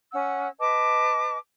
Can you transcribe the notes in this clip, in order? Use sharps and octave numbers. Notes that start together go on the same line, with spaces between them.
C#4 F#5 E6
B4 D#5 A5 D6